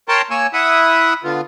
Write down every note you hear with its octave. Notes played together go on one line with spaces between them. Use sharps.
A#4 C#5 G5 A5 A#5 C6
A#3 C#5 G#5 E6
E4 E5 F#5 D#6
D3 B3 F4